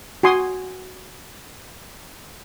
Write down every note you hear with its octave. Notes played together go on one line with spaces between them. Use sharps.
F#4 G#5 C6 D#6